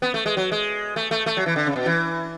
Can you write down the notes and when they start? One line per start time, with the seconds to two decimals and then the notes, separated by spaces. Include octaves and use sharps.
0.02 B3
0.14 A3
0.26 G#3
0.37 F#3
0.52 G#3
0.96 A3
1.11 A3
1.26 A3
1.37 F#3
1.46 E3
1.56 D3
1.67 C#3
1.76 B2
1.86 E3